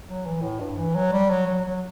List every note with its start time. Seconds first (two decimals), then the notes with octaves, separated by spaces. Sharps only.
0.08 F#3
0.25 E3
0.42 A2
0.60 G2
0.78 E3
0.95 F#3
1.12 G3
1.30 F#3
1.47 F#3
1.65 F#3